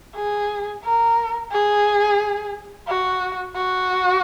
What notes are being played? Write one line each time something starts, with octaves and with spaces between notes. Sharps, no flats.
G#4
A#4
G#4
F#4
F#4